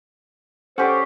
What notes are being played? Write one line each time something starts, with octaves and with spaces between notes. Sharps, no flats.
C#4 G4 A4 C5 D5 F#5